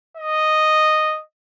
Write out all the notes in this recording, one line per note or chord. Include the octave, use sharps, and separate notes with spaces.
D#5